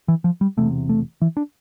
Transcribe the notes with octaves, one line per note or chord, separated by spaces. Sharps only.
E3
F3
G3
E1 E2 C3 A3
A3
E3
D4